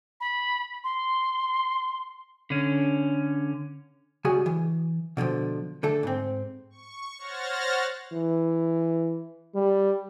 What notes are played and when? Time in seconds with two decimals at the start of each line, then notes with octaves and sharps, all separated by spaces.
0.20 B5
0.84 C6
2.50 D3 C#4
4.25 C#2 G3 F#4 G#4 G#5
4.46 E3
5.17 B2 D3 E3 F3
5.83 D3 A3 A4
6.03 G#2 C4
6.70 C#6
7.18 C5 C#5 F#5 F6 A6 A#6
8.13 E3
9.55 G3